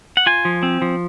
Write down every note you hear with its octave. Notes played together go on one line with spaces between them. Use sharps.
F#5
F4 G#5
F3
C4
F3